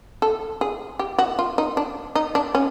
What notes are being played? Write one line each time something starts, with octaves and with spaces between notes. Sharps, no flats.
A4
G#4
G4
F#4
F4
D#4
D4
D#4
D4
C#4